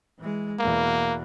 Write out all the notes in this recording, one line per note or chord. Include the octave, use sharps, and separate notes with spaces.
E3 G#3
E2 B2 A#3